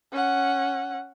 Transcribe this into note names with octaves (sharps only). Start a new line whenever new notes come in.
C#4 F#5